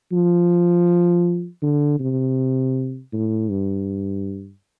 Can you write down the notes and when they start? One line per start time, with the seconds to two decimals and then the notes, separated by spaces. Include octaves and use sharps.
0.12 F3
1.62 D3
2.00 C3
3.13 A2
3.50 G2